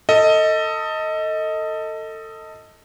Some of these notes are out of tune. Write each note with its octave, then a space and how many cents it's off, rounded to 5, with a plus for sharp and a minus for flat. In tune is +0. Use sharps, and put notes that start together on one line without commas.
A4 +25 D#5 +15